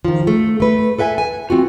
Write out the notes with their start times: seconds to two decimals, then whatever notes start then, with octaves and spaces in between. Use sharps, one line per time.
0.05 D#3 F3
0.27 A3
0.60 A3 B4
0.99 A4 B4 E5 G5 G#5
1.18 G#5
1.50 C4 F4 F#4